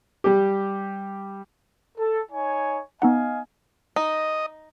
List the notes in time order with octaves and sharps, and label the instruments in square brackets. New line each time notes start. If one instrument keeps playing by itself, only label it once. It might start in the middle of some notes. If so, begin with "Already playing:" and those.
[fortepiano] G3 G4
[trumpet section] A4
D#4 C#5 G#5
[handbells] B3 D#4 F#5 [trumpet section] D#5 F5 G#5
[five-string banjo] D#4 [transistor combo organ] D#5